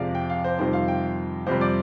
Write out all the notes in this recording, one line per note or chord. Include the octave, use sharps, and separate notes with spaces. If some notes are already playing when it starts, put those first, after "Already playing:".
Already playing: F2 C3 F3 G#3 D5 F5
G5
F5
C5
F2 C3 D#3 G3 C5
F5
G5
F2 C3 G3 C5
D5